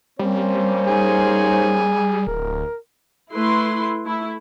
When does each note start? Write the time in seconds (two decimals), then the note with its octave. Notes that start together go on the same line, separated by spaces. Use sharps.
0.19 G3 A#3 C4 C#4 C5
0.88 D#4 G#4
2.27 D1 A#4
3.31 A3 E4 B4 C6
4.06 A3 E4